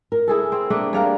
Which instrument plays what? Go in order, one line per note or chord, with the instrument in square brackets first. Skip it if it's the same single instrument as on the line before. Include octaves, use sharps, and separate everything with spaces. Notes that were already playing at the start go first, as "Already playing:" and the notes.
[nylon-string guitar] A#4
[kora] E4 G#4 A4 [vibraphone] E6
[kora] C4
A3 A#3 D4
[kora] G3 D4 A#4 [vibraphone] G#4 F5 A#5